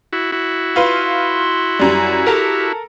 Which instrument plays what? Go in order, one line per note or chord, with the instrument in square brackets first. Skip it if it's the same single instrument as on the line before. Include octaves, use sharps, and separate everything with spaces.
[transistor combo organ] E4 F#4
E4 F#4
[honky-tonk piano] F4 B4 [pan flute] C6
[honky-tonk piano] F#2 G3
[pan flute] G4 [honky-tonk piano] A4 A#4